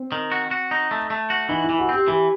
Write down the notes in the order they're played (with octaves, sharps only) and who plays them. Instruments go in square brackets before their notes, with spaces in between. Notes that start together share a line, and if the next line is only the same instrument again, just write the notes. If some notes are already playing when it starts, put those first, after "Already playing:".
Already playing: [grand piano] C4
[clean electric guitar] D#3
F#4
F#4
D#4
A3
A3
F#4
[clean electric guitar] E3 [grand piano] D#4
[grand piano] E4
[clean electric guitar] E3
[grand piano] F#4
[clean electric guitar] C4 [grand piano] G4
[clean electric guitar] E3 [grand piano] G4